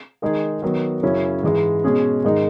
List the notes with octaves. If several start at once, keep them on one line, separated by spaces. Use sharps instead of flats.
D#3 G#3 D#4 G#4
D#3 F#3 B3
F#2 C#3 F#3 C#4 E4
G#2 E3 G#3
B2 G#3 C#4 G#4
G#2 D#3 G#3 D#4